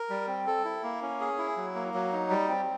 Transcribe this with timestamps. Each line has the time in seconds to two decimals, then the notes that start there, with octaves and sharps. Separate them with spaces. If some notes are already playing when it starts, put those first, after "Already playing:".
Already playing: A#4
0.10 G3
0.27 C4
0.47 A4
0.65 E4
0.83 A#3
1.02 C#4
1.20 G#4
1.38 E4
1.56 F#3
1.75 A#3
1.94 F#3
2.12 D#4
2.30 G3
2.48 C4